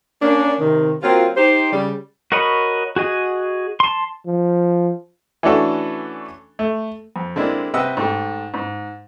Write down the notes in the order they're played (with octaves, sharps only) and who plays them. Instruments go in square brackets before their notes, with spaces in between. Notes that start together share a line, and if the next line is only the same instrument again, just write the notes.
[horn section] A#3 C#4 D4
C3 D#3
F#3 A#3 C4 F4
D#4 G4 C5
C#3 G3
[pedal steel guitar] F#4 A#4 C#5 D#5 B5
F#4 G#4 D#5
A5 C6
[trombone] F3
[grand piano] E3 A3 C#4 D4 F#4 A4
A3
[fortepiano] F2
D3 G#3 A#3 C4 D4 E4
C3 G4 B4 D#5 F#5 E6
G#2 A3 G4
G#2